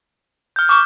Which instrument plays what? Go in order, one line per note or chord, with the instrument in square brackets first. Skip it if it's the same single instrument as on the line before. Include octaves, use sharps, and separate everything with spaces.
[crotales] F6 G6
[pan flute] C#6 [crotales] D6